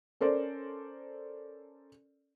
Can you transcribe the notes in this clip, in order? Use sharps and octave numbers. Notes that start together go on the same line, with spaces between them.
C#4 A4 A#4 C5 D5